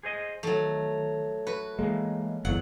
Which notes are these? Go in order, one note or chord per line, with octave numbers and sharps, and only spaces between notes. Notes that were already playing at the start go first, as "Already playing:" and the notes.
G#4 C5 D#5
D#3 F#3 A3
F#4 B4
E3 G#3 A#3
G1 E2 D#3 F#3 F#5